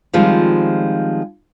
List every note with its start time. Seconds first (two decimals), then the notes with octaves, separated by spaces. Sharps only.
0.13 D#3 F3 G3 G#3 C4 F4